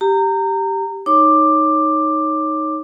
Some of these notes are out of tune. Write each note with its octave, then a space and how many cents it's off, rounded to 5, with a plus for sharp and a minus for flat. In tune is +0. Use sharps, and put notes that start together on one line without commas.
G4 -5 A#5 -25
D#4 +0 C#5 +0 D6 +10